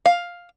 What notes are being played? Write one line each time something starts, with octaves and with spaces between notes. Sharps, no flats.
F5